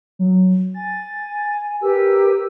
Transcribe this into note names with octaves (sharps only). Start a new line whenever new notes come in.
F#3
G#5 A6
G4 A#4 B4 E6